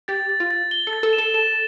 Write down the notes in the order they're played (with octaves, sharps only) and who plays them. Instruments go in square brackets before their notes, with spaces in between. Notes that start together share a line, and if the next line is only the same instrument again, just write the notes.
[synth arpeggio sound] G4 [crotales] A6
[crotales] A6
[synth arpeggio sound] F4
[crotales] A6
G7
[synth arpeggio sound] A4
[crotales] A6
[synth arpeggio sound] A4
[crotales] E7
[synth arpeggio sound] A4
[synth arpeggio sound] A4 [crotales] E7